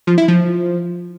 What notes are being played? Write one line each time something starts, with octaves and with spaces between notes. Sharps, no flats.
F3
E4
F3